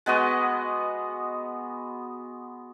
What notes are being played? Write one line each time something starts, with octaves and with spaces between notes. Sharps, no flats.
G#3 B3 F#4 D#5